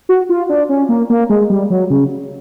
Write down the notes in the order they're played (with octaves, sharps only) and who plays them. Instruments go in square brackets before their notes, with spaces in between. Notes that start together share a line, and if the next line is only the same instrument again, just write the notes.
[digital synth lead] F#4
F4
D4
C#4
A#3
A#3
G#3
G3
F#3
C#3